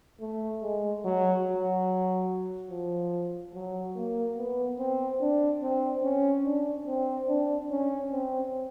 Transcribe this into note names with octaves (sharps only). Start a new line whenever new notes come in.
A3
G#3
F#3
F#3
F3
F#3
A#3
B3
C4
D4
C4
C#4
D4
C4
D4
C#4
C4